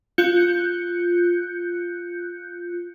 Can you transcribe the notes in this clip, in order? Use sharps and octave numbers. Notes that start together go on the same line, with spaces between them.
F4 F#6 G6 C#7